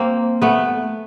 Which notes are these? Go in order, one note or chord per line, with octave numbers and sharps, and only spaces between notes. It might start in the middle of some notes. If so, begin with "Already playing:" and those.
Already playing: A#3 C4
A3 B3